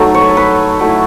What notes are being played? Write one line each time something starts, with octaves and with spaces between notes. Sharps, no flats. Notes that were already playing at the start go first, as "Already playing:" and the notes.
Already playing: F#3 A3 D#4 A4
C#5
B4
A4
B4
F#3 A3 E4